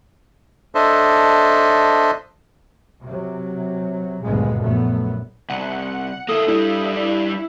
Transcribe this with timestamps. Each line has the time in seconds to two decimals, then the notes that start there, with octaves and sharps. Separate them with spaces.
0.75 D4 A4 C5 D#5 E5
3.06 C3 F#3
4.24 F#1 D2 G2 A#2 G#3 B3
4.61 A#1 F#2 A3 B3
5.50 C2 F#5
6.28 A#3 E4 A4 D#6
6.48 G3 D4 E4